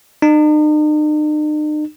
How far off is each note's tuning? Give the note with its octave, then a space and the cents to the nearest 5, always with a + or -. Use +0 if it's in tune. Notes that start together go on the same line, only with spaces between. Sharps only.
D#4 -45